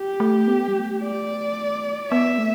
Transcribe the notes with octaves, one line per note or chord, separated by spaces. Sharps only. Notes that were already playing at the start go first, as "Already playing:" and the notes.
Already playing: G4
A3
B3
G3
A3
D5
B3 E5
A3